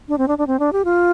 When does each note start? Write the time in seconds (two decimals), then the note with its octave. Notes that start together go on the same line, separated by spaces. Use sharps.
0.09 D4
0.18 C4
0.28 D4
0.38 D4
0.47 C4
0.59 D4
0.73 G4
0.85 F4